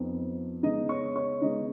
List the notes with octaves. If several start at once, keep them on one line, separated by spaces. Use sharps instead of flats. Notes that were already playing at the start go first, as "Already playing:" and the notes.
Already playing: F2 F3 B3 D#4
C#3 G#3 B3 D#4 D#5
C#5 C#6
C#5 C#6
C#3 G#3 B3 D#4 D#5